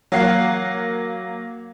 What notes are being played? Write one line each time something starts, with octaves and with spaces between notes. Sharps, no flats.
F#3 A#3 F5 F#5 C7